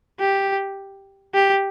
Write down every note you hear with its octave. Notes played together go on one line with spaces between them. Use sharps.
G4
G4